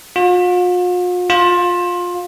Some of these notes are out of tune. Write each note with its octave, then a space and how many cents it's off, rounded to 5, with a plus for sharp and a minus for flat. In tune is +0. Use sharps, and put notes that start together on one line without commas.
F4 +45
F4 +20